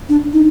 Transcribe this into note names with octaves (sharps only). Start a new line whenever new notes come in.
D4
D#4